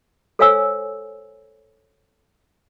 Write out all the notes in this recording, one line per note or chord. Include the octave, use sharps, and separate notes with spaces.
A4 C5 C#5 F5 G#5 E6